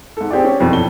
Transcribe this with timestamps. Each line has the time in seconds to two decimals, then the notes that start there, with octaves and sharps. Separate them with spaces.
0.17 G#2 A4
0.30 C4 G4 G#4 D5
0.44 C#4
0.60 F2 B2 E3
0.72 F2 A4 G7